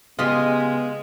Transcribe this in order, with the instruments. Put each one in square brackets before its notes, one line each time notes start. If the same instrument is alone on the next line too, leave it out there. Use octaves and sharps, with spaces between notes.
[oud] C#3 G4 D#5 [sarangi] G#3 [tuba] B3 [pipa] F4